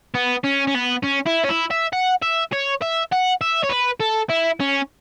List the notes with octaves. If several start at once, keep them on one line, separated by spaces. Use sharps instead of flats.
B3
C#4
C#4
B3
C#4
E4
C#4
E4
E5
F#5
E5
C#5
E5
F#5
E5
C#5
B4
A4
E4
C#4